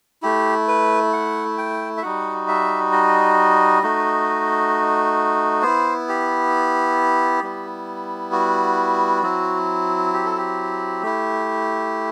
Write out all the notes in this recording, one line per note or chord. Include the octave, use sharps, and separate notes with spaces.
A3 E4 G4
B4
F#5
G5
E5
G3 D#4 F#4 F#5
E5
D#5
A3 D#4 F#4
B3 E4 C5
G4
G3 B3 E4
F#4
F#3 C4 E4
G4
A4
G4
A3 E4